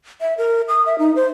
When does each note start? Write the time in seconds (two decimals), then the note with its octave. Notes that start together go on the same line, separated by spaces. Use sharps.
0.21 E5
0.38 A#4
0.68 D#6
0.86 E5
0.99 D#4
1.16 C5